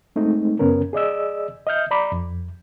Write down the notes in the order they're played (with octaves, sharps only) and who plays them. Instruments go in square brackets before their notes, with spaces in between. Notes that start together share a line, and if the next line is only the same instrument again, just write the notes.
[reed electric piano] G#3 A3 C4 D#4
F#2 C#3 B3 C#4 A#4
G#4 D5 D#5 E6
D#5 E5 F6 G6
D5 A#5 B5 D6
F2